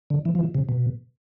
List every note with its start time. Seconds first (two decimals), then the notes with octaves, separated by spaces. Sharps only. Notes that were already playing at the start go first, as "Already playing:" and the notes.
0.10 D3
0.25 E3
0.35 F3
0.40 E3
0.54 C3
0.69 B2